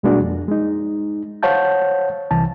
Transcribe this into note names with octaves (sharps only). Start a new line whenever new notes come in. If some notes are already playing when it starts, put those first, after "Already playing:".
B2 G3 G#3 A#3 D4 F#4
F2
G#3 D#4
C5 C#5 F5 F#5 A5 G6
C2 E3 A5